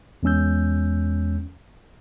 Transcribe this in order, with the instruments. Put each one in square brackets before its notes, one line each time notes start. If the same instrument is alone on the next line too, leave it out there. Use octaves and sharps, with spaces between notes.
[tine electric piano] E2 G#3 C#4 E6 G6